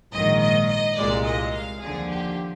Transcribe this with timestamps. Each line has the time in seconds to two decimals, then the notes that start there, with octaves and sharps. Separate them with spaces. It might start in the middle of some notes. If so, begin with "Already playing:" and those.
0.11 A#1 G#2 D#3 D#5
0.40 D#5
0.69 D#5
0.96 C2 A#2 G#3 D5
1.25 D#5
1.53 F5
1.81 D#2 D3 F3 G#4
2.09 G4